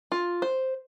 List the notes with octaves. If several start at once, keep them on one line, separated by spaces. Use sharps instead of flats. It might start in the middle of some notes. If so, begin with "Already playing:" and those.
F4
C5